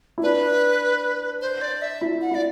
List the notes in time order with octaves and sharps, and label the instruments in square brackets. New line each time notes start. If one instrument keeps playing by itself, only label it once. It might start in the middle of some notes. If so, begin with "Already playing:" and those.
[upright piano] E4
[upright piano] D4 [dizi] B4
[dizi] C5
D5
E5
[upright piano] E4
[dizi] F#5
[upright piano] E4 [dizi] D5